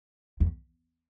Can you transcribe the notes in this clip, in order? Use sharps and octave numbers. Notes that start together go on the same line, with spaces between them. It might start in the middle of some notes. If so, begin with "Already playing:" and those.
E2